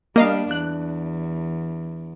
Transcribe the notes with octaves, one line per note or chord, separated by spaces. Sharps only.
G3 A#3 D4 D#5 F5
E2 F#6